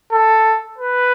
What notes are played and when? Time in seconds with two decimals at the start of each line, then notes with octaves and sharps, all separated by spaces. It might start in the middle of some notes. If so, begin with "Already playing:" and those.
0.12 A4
0.78 B4